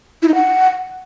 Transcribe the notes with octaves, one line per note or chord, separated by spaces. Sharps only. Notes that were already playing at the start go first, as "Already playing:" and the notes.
E4
D#4
F#5